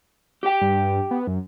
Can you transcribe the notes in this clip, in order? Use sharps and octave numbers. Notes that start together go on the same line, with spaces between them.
G4 G5
G2
B3
F#2